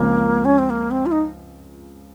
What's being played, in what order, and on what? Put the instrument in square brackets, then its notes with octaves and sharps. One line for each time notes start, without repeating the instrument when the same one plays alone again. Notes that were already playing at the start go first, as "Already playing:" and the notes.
Already playing: [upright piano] C#2 C#3 F3 C4 [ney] A#3
[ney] C#4
C4
A#3
C4
F4
D#4